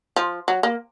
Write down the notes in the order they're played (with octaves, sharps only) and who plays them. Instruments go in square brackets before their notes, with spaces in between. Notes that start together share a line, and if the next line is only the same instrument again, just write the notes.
[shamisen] F3
F#3
A#3